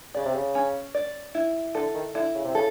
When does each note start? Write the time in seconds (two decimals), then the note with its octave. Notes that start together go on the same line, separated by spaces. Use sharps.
0.14 C#3 D5
0.25 C3
0.34 C#3
0.55 C#4
0.95 D5
1.35 E4
1.75 D3 A4
1.94 D#3
2.15 D3 E4
2.35 C#3
2.45 C3
2.55 C#3 A4